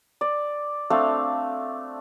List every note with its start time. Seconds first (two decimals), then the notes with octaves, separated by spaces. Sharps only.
0.21 D5
0.90 A3 C4 D4 F5